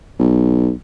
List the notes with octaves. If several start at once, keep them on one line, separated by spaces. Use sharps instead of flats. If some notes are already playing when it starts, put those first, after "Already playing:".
B1